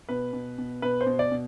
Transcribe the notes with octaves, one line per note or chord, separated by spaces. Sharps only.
B2 B4
B2
B2
B2 B4
C5
B2
D5
B2